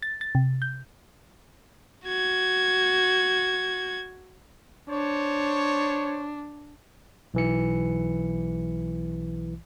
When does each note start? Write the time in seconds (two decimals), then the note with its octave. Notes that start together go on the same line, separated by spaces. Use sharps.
0.03 A6
0.21 A6
0.35 C3
0.62 G6
2.05 F#4 G#6
4.90 D4 C5 C#5
7.34 B1 E3 C#7